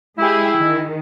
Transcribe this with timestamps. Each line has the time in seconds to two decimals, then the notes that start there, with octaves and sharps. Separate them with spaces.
0.18 G#3 E4 G4 G#4
0.58 D#3